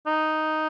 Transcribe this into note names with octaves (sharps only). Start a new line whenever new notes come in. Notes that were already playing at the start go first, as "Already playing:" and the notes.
D#4